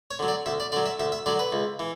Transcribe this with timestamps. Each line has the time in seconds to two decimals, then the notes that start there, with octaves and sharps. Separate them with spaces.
0.11 C#5
0.19 D3 F#3
0.28 D5
0.46 D2 E5
0.60 D5
0.72 D3 F#3 D5
0.86 E5
0.99 D2 E5
1.12 E5
1.26 D3 F#3 D5
1.39 B4
1.52 C#2
1.79 E3